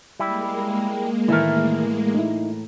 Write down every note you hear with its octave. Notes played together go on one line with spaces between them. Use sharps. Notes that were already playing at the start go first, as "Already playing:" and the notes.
G3 G#3 A#3 E4 E5
A2 D#3 E3 A3 A#4 E5 F6
D#4 E4